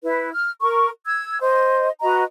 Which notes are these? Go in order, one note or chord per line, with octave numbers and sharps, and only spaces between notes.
E4 B4
F6
A#4 C#6
E6 G#6
C5 D#5
F#4 B4 D#5 A#5